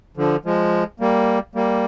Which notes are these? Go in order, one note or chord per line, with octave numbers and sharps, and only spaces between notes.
D3 F3
F3 G#3
G3 A#3
G3 A#3